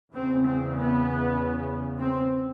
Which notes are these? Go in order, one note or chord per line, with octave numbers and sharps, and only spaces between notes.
E2 C#3 C4
C4
B3
C4